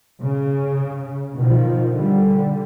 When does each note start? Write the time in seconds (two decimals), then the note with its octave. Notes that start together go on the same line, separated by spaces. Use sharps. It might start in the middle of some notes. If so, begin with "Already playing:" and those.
0.22 C#3
1.36 B2 D#3 F3
1.94 D3 G3